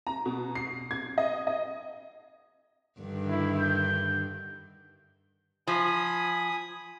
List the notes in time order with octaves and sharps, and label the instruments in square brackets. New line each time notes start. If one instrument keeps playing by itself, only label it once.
[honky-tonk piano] A#5
B2
C7
G#6
D#5
D#5
[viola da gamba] G2 D3 D#3
[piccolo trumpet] E4
G6
[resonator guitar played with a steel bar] F3 [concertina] G#5 B5 D#6